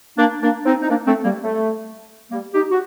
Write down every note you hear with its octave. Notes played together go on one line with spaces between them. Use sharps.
A#3 D4
A#3 D4
C4 D#4
D#4
A#3 D4
A3 C4
G3 A#3
A3
G3 A#3
D#4 G4
F#4